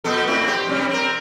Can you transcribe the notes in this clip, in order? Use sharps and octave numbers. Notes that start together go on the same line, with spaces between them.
A#2 B3 A4
A2 C4 E4
G4 C5
G2 C3 G3
C4 A#4